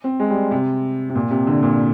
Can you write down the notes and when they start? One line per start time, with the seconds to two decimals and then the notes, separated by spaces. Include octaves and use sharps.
0.04 C4
0.20 G#3
0.30 G3
0.51 C3
1.10 C3
1.15 A#2
1.31 C3
1.47 D3
1.63 A#2